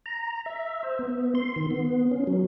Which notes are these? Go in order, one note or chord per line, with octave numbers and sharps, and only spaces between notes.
A#5
E5
C5
B3
C6
D#3
B3
C#4
F#3